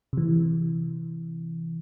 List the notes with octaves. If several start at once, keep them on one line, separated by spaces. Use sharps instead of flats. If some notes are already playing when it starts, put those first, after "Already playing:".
C3 E3